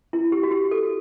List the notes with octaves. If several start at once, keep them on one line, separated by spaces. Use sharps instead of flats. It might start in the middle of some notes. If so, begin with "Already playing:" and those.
E4
G4
F#4
G4
A4